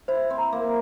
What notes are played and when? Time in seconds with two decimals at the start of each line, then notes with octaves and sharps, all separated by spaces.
0.08 E4 C5
0.30 C4
0.38 A#5
0.53 A#3